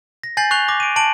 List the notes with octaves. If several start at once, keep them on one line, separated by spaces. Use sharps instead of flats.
A#6
G#5 G6 A6 C7 F#7
C#6 F#6 C7 F7 G7
D6 A#6
D7 D#7
A5 D7 F#7